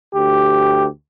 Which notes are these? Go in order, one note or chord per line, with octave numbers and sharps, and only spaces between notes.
D2 G4